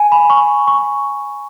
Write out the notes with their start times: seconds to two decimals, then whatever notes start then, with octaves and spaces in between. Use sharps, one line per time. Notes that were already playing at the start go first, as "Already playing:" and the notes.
Already playing: G#5
0.12 B5
0.30 C#6
0.67 C#6